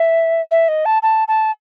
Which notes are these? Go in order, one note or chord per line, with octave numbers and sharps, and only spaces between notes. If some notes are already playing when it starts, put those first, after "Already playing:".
Already playing: E5
E5
D#5
A5
A5
A5